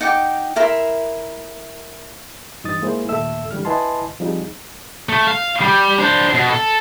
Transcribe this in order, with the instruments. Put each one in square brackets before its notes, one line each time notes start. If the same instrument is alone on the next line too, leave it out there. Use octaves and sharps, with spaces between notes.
[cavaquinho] D#4 F#5 G5 D6
E4 A#4 E5 C6
[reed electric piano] G2 E3 D#4 D#6 A6
G#3 A#3 E4 G#4 C5
D#2 A#2 A3 A4 E5 E6
D3 E3 G3 A3 F6
E4 B4 D#5 G#5 A5 C6
F3 G3 C4 D#4 G#4
[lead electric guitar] A3
F5
G3
D4 C5
B2
A4